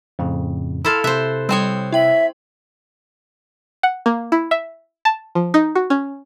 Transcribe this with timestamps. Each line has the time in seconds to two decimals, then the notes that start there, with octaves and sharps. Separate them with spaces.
0.19 F2 A2 C#3
0.85 E4 A4 F5 A#5 C6 F6
1.04 C3 C5 E5 F#6
1.49 G3 C4 C5 C#5 G5 D#6
1.93 E4 E5 G5 F#7
3.83 F#5
4.06 A#3
4.32 E4
4.51 E5
5.05 A5
5.35 F3
5.54 D#4
5.75 F#4
5.90 C#4